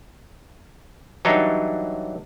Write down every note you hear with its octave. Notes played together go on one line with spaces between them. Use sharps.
E3 F#3 G3 D4 D#4 C#5